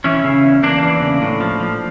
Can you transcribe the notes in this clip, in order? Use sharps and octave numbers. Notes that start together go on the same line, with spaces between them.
E3 C#4 E4
C#3
E2
E2 A#3 D4
E3
C#3
A2
F3
F3